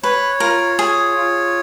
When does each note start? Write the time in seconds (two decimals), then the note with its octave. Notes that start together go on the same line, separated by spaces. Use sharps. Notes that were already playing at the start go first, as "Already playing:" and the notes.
0.03 B4 C#5
0.40 F4 A#4
0.79 G#4 C#5
1.17 F4